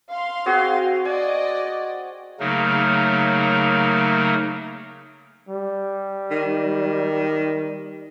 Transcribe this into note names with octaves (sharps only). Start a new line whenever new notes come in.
F5 C6
C4 F#4 G#4
D5 D#5 G#5
C#3 F#3 A3 A#3 D#4 A#4
G3
D#3